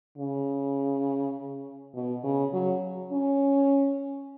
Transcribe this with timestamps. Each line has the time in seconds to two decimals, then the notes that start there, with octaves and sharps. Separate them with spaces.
0.18 C#3
1.95 B2
2.24 C#3
2.53 F#3
3.12 C#4